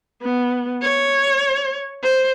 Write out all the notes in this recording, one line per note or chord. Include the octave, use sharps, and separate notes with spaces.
B3
C#5
C5